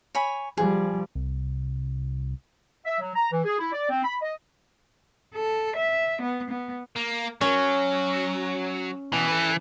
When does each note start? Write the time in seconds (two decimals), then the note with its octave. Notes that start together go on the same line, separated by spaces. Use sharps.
0.15 C#5 G#5 B5
0.57 F3 G3 G#4
1.15 C2
2.85 E5
3.00 F#3
3.16 A#5
3.32 E3
3.45 G#4
3.59 E4
3.73 D5
3.90 C4
4.04 B5
4.22 D#5
5.35 A4
5.76 E5
6.22 B3
6.50 B3
6.96 A#3
7.41 F#3 C#4
9.13 B2 E3
9.28 A4 B4